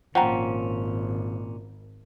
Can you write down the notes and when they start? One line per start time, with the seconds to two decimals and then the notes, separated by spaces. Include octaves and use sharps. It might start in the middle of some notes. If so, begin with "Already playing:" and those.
0.15 G#1 A#2 F3 C#4 F#5 G5 A#5